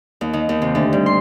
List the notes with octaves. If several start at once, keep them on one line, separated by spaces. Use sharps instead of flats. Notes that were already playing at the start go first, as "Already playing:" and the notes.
D#2
D#3
D#2
C3
D2
G2
C6